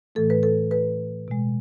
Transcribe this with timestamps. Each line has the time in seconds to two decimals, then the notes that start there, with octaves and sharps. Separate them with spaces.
0.15 A2 E3 A3 A4
0.30 B4
0.43 A4
0.71 B4
1.28 B2 G#3